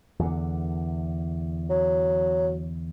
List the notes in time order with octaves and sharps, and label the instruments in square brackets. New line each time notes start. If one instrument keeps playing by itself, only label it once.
[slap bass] E2 D3
[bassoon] F#3